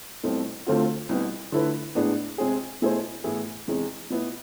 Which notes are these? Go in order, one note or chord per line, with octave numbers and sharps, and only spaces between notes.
C2 B2 A3 C4
D2 D3 A3 C4 F4
C2 B2 B3
D3 A3 E4 B4
A2 G#3 B3 D4
C3 G#3 C4 G#4
B2 A3 E4 G#4 C5
A2 E3 B3 E4 G#4
E2 C3 G#3
B2 B3 E4